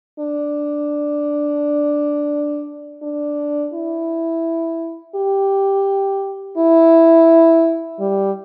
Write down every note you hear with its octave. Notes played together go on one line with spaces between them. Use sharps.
D4
D4
E4
G4
E4
G3